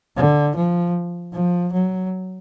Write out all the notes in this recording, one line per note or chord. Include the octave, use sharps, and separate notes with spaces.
D3
F3
F3
F#3